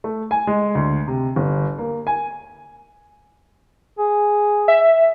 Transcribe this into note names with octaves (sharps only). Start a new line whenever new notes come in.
A3
G#5
G#3
D2
C3
G1
A#3
G#5
G#4
E5